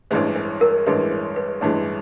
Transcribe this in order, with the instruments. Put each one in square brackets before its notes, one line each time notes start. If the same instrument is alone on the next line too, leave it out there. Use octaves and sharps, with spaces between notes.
[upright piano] A1 G2 E3 G#3 [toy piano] C5
[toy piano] C5
A#4
[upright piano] A1 G2 E3 G#3 [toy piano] B4
[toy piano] C5
B4
[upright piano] A1 G2 E3 G#3